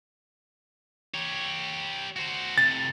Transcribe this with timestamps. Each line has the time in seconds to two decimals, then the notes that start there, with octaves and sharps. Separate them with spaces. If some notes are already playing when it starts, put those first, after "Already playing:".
1.14 G4 C#5
2.16 F#4 C5
2.58 A2 C3 A6